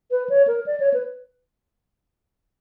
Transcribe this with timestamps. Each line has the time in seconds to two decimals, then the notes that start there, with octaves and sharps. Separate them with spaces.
0.11 B4
0.30 C#5
0.47 A#4
0.66 D5
0.80 C#5
0.94 B4